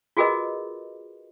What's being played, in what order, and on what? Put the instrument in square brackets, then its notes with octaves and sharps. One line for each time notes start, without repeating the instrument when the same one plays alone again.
[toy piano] F4 F#4 G#4 A#4 B4 D#5